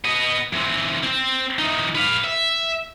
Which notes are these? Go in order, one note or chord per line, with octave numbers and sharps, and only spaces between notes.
B3 D#5
E3 C4
C4 G5
E3 D#4
B4 F5
E5